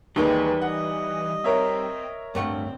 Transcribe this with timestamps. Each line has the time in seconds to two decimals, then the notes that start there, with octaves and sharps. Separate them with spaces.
0.16 D#2 E3 G3 G#3 D#4 G4 B4
0.61 D#5 F#5
1.44 C4 A#4 C#5 E5
2.35 D1 G2 A3 C4 F#5